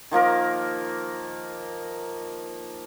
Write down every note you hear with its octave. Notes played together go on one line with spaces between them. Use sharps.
D#3 F3 A#3 A#4